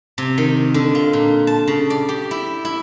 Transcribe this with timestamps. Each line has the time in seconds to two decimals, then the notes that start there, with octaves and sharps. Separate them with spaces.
0.18 C3
0.38 D#3
0.74 D3
0.95 F4
1.13 A#2
1.47 A5
1.68 C#3
1.90 D5
2.09 G4
2.31 E4
2.65 E4